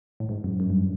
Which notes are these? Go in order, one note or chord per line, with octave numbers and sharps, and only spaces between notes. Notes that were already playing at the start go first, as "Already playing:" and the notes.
A2
G#2
F#2
F#2
G2